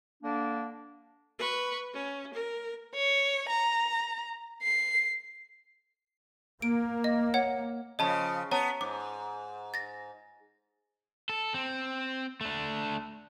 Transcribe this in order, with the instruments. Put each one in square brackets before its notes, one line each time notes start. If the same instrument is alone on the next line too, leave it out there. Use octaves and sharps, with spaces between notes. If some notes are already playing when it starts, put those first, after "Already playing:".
[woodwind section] D3 A#3 D4
[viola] B4 C#6
C#4
A#4
[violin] C#5
A#5
C7
[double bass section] A#3 [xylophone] D7
[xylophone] D#5
C#5 F#5
[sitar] C#3 F3 [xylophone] D#5 A5 B5
[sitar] B3 [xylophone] C#5 A5 A#5
[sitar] G#2 [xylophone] D6
[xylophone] A6 A#6
[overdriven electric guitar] A4
C4
A3 D4